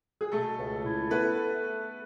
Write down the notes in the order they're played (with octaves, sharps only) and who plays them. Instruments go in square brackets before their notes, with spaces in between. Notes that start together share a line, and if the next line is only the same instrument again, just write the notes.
[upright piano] G#4
[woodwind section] B2 [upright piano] A3 A4
[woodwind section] C#2
E4
[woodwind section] A3 [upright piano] B3 B4